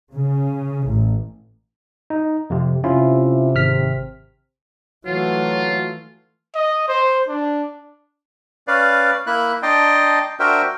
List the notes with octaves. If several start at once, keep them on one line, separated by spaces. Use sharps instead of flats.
C#3
A1
D#4
F2 C3
C3 C#4 E4 F4
G#1 F6 B6
E3 F#3 A3 F4
D#5
C5
D4
C#4 B4 D5 F5
A#3 E4 E5 F#6
D4 D#5 G5 A5 A#5 C6
D4 F#4 A#4 C5 E5 G5